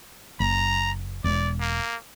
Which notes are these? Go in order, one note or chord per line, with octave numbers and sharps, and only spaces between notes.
F#1 A#5
E1 D5
A#3